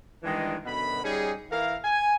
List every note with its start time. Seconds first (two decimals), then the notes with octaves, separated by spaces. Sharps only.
0.23 G2 D#3 E3 G#3 D4 D#5
0.66 F#2 B2 D3 B3 B5
1.03 G3 C#4 D#4 G#4
1.50 E3 A#4 F5
1.84 G#5